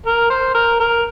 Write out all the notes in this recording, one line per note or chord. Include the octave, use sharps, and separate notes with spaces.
A#4
C5
A#4
A#4